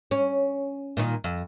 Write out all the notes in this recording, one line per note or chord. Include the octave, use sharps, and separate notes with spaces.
C#4
A#2 D#3 D#4
F2